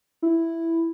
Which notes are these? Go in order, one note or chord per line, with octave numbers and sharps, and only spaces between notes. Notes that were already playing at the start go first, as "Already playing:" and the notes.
E4